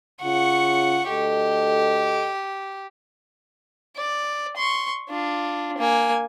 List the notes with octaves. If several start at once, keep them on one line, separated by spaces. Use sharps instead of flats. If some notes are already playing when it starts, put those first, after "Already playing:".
C#3 F4 F#5 C#6
D2 G4 A4 D#5
D5
C6 C#6
D4 F4
A#3 G#5